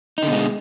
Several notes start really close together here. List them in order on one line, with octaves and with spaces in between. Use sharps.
D#4 D3 B2 G#3